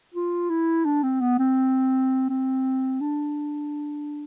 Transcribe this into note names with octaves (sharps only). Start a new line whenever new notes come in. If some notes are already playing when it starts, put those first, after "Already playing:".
F4
E4
D4
C4
B3
C4
C4
D4